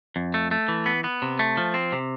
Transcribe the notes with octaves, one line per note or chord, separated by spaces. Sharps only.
F2
A3
A3
E3
B3
B3
C3
A3
F3
C4
C3